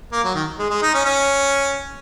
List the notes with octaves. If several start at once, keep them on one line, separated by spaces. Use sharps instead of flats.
A#3
F#3
D#3
G#3
G#3
D#4
C#4
C#4